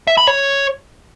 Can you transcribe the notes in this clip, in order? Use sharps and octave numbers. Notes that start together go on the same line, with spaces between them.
E5
B5
C#5